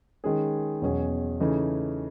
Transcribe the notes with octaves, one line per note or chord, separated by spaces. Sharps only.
D#3 G#3 C#4 G#4
E2 B2 F#3 C#4 G#4
C#3 E3 A3 D#4